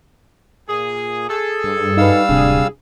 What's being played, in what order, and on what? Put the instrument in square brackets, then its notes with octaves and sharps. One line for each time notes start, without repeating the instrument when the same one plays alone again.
[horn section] A#2 G#4
G#4 A4
[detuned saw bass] G2
[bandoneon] G3 F5 E6 [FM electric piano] D#4 B4
[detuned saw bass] D1 [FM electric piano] C3 D4 [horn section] G#4